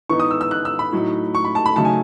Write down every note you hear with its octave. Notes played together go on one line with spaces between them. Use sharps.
E3 B3 D#4 C#6
D#6
E6
E6
F#6
E6
B5
A2 F#3 A3 D#4
C#6
B5
A5
B5
C#3 F#3 A3 D#4 A5
G#5